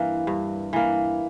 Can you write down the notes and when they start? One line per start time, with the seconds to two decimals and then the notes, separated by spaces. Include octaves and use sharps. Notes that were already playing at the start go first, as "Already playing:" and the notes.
Already playing: G2 E3 A#3
0.27 G2
0.73 E3 A#3